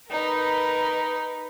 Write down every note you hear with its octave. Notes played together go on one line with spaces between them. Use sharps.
D#4 A#4 B4